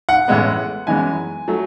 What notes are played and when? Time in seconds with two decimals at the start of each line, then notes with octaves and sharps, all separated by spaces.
0.09 F#5
0.28 A1 A2 G#3 B3
0.87 F#2 E3 G#3 B3 G#5
1.48 F#3 A3